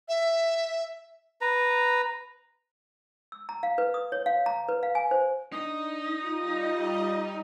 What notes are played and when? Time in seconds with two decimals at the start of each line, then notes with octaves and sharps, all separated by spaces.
0.09 E5
1.41 B4 A#5
3.32 E6
3.49 A#5
3.63 F5
3.78 B4
3.94 D#6
4.12 C#5
4.26 F5
4.46 A#5
4.69 B4
4.83 F5
4.95 G#5
5.11 C5
5.52 D4 D#4 D#6
6.23 G3 F4 D#5